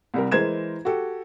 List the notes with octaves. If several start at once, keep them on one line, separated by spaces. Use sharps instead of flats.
C2 G3 A#4
E3 G#3 A#4 C5 G#6 E7
F#4 G4 A4